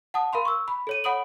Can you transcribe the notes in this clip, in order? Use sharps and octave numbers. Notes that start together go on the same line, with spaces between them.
F#5 A5 D#6
A#4 F5 B5 C6
C#6 E6
B5
A4 C#5 D#7
C#5 F#5 B5 D#6 D7 F#7